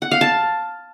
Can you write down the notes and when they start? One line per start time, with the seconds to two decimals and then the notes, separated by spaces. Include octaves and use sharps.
0.02 F#5
0.11 F5
0.21 A5